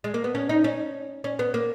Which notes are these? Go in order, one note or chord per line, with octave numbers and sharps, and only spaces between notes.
G#3
A#3
B3
C#4
D#4
C#4
C#4
B3
A#3